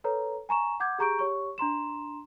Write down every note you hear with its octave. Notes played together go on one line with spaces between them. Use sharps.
A4 B4 C#5 A#5
G#5 A#5 C#6 E7
F#5 D6 G6 G#6
G4 G#4 A#5 C#6 G6 D7
G4 C#5 C#6
D4 A#5 C6 E7